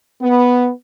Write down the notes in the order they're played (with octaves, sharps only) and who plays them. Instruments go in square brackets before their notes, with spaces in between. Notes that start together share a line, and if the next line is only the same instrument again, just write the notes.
[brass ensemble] B3